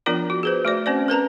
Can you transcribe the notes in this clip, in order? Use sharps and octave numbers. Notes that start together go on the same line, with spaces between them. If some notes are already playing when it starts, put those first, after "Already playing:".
F3 B3 D4 F4 A#4 D5
F#4
G#4 B4 C5
A3 F#4 D5
C4 C#4 C5 D5
A#4 B4 A5 A#5